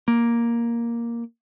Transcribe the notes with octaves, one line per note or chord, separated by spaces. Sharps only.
A#3